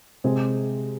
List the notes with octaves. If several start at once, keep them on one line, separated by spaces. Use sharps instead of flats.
C3 G#3 C4 G#4